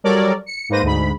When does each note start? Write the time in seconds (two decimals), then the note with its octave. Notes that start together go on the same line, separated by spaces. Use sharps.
0.04 F#3 G3 A4 A#4 C#5 D5
0.46 C#7
0.69 G#2 A#3 B4 C5 A#6 D#7
0.82 D2 G#2 B5